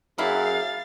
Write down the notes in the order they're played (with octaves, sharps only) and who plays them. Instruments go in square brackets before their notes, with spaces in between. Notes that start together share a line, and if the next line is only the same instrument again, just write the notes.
[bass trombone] F#2 [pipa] A#3 E4 [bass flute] G#4 [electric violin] F5 A6